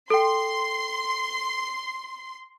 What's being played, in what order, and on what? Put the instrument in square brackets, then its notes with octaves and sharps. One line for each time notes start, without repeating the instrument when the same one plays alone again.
[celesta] A4 G5 [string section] C6